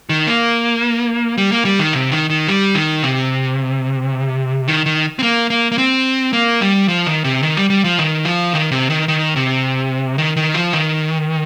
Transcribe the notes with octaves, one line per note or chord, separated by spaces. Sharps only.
D#3
A#3
G3
A#3
G3
D#3
C3
D#3
D#3
G3
D#3
C3
D#3
D#3
C4
A#3
A#3
A#3
C4
A#3
G3
F3
D#3
C3
D#3
G3
G3
F3
D#3
F3
D#3
C3
D#3
D#3
C3
D#3
D#3
F3
D#3